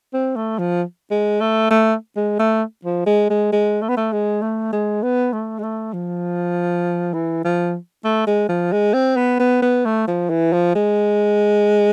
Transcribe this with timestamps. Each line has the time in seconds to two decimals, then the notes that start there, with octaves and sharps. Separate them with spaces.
0.13 C4
0.36 A3
0.59 F3
1.11 G#3
1.41 A3
1.70 A3
2.16 G#3
2.39 A3
2.85 F3
3.06 G#3
3.30 G#3
3.52 G#3
3.81 A3
3.89 B3
3.97 A3
4.12 G#3
4.42 A3
4.72 G#3
5.03 B3
5.33 A3
5.59 G#3
5.63 A3
5.93 F3
7.13 E3
7.44 F3
8.04 A3
8.27 G#3
8.49 F3
8.72 G#3
8.94 C4
9.17 B3
9.40 B3
9.62 B3
9.85 A3
10.07 F3
10.30 E3
10.53 F3
10.75 G#3